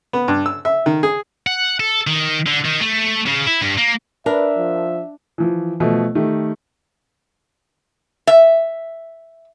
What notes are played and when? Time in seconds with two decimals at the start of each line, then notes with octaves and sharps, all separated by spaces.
0.13 B3
0.28 G2
0.46 E6
0.65 E5
0.86 D#3
1.03 G#4
1.47 F#5
1.80 A4
2.07 D#3
2.47 D3
2.65 D#3
2.81 A3
3.27 C#3
3.47 E4
3.62 G2
3.78 A#3
4.26 D4 A#4 B4 E5
4.57 F3
5.38 E3 F3
5.80 B2 F3 A3
6.15 D#3 A3 G4
8.27 E5